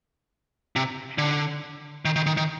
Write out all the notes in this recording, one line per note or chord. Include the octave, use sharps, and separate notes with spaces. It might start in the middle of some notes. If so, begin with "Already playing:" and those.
C3
D3
D#3
D#3
D#3
D#3